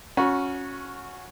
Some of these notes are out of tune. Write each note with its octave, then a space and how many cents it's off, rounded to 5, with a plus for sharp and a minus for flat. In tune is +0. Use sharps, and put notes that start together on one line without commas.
C#4 +0 F#4 -20 A#5 +45